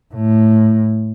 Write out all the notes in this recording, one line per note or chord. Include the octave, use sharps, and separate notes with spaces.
A2